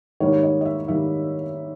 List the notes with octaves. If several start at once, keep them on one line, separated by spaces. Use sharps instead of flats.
G#2 D#3 G3 A#3 C#5
D#5
D#5
E5
G#2 D#3 G3 A#3 E5